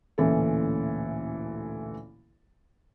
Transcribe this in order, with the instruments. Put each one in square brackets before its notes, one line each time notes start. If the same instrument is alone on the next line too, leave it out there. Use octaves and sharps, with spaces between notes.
[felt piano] A1 D2 A#2 E3 C#4 A4